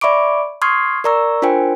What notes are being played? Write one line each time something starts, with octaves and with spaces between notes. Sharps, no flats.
D5 E5 B5 C#6 D6 D7
C6 C#6 D#6 F6 G#6 C7
A#4 D5 A#5 C#6 E6
D4 F4 A#4 C5 G5 G#5